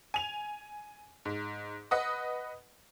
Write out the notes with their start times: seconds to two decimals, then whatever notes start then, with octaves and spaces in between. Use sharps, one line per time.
0.14 G#5 F7
1.25 G#2
1.91 B4 D#5 F#5 D#6